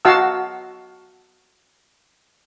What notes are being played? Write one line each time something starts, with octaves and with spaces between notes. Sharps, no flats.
F#4 D#5 F5 A5 E6